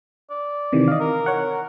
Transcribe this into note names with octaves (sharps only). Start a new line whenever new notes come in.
D5
C3 D#3 E3
D#5 F5
A#4
C#5 F#5